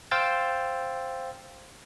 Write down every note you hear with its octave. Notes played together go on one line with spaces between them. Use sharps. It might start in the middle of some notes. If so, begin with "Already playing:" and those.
C5 F5 G5 E6 G6 A6